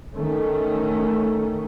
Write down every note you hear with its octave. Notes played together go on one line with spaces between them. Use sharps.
D#3 A3 C#4